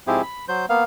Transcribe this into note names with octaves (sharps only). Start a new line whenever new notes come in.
G#2 F3 C4 E4 G4 G#4
B5
F#3 C5 G6
A#3 B3 F5